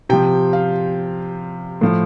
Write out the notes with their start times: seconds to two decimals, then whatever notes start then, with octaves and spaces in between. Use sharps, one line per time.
0.09 C3 F3 G5
0.53 F5
1.81 A2 F3